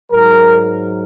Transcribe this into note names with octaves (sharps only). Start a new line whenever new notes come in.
G#2 F#3 A#4